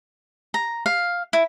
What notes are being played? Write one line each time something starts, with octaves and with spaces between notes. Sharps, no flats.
A#5
F5
E4